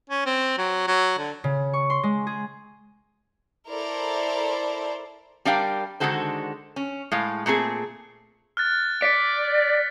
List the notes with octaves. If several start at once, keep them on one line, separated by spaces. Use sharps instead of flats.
C#4
C4
F#3
F#3
D3
C#3
C#6
C6
G#3
G#4
E4 A4 A#4 C5 D5
G3 D4 A#4 D5 F5 G5
D3 D#3 G#3 F#4 A4 C5
C#4
A2 G#3 F5
A#2 A3 C4 G#4
F6 F#6 A6
D5 B6 C#7